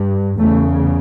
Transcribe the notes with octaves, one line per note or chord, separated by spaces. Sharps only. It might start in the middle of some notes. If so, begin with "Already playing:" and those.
Already playing: G2
E2 C#3 A3